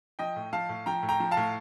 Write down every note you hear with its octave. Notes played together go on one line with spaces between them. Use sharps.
F3 D#5 G5
A2
F3 F5 A5
A2
F3 G5 A#5
A2
G5 A#5
F3
F5 A5
A2